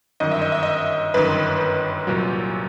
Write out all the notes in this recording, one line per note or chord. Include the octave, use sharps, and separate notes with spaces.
G1 F#2 D#3 D#5
E5
D#5
E5
D#5
G1 F#2 D#3 B4
C2 A#2 F#3